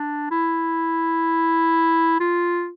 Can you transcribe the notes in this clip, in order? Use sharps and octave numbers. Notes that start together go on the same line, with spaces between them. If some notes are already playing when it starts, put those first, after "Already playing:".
Already playing: D4
E4
F4